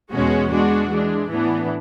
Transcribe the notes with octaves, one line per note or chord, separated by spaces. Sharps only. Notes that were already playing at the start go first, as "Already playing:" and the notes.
E2 B2 G#3 C#4 F#4
B2 G#3 D4 F#4
E3 G#3 D4
A2 E3 B3 D4